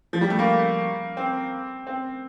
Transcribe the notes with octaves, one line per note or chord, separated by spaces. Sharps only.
F3
G3
A3
A#3
C4
C4